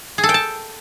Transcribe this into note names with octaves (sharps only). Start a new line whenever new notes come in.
G#4
A4
G5
A5